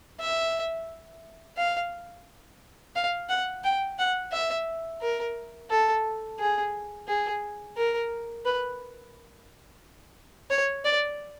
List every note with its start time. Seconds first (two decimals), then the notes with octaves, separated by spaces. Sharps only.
0.20 E5
1.57 F5
2.96 F5
3.29 F#5
3.64 G5
3.98 F#5
4.32 E5
5.01 A#4
5.70 A4
6.39 G#4
7.08 G#4
7.76 A#4
8.45 B4
10.50 C#5
10.84 D5